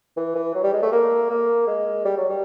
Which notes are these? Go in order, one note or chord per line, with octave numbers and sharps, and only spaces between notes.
E3
E3
F#3
G3
G#3
A3
A#3
A#3
G#3
G3
F#3
G3